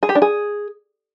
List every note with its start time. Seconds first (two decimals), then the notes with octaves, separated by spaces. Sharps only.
0.03 G#4
0.09 G4
0.15 D4
0.22 G#4